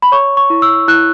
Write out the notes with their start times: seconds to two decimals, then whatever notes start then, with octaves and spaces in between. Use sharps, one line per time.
0.02 B5
0.12 C#5 C#6
0.37 C#6
0.50 E4
0.62 E6
0.88 E4 F#6